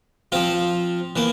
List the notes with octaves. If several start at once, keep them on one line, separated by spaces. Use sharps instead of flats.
F3 C4 F4
E3 A#3